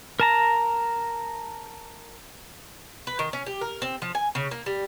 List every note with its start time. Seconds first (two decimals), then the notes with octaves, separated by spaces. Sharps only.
0.20 A#4 A5 A#5
3.07 B4
3.19 D#3
3.33 C#4
3.46 G4
3.61 A#4
3.82 C4
4.02 F3
4.15 G#5
4.35 C#3
4.51 A#3
4.66 G3